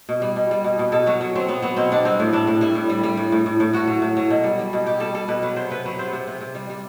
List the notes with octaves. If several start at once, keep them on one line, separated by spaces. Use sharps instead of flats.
B2
G3
B2
G3
B2
B2
B2 A4
F#3 F#4
F#3
F#3 C4
F#3 B3
F#3 B3
B2 C4
B2 D4
G3 C4
A2
A2 D4
A2
G3 E4
A2
G3
G3
A2
A2
A2
A2
A2 F#4
F#3
A2
F#3
B2
G3
G3
B2
B2 G4
G3 A4
G3 A4
B2 B4
F#3 B4
C3 C5
C3 B4
F#3 B4
C3 C5
C3
C3
C3
G3
G3